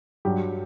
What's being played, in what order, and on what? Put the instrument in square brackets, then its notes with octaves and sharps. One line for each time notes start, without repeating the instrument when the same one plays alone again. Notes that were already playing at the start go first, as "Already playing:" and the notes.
[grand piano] G2 F#3 G4